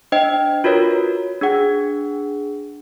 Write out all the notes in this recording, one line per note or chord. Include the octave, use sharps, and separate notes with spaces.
D4 C5 D#5 G5
F4 F#4 A#4 B4 C#5
D4 G#4 F#5